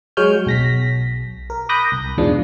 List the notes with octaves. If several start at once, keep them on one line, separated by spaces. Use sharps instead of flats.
F#3 G#3 C#5 F6 G6
B1 A#6 B6
A#4
B5 D6 D#6 F#6 G6 A#6
C2
E2 G#2 B2 F3 G#3 D4